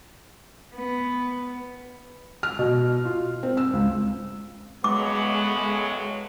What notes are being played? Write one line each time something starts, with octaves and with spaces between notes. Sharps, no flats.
B3
F6
B2
F4
C4
E6
C#2
A2 C#3 F#3 G#3 B3 D6